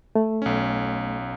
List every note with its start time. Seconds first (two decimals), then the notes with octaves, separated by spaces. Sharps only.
0.15 A3
0.42 B1 C#4